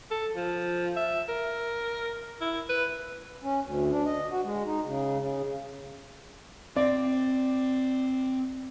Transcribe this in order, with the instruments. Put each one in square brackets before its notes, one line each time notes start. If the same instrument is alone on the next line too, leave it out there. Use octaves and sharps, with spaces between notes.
[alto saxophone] A4
F3
E5
A#4
E4
B4
[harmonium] C#4
D2
D4
D#5
F#4
G#3
D#4
C#3
C#3
[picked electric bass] C4 [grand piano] D5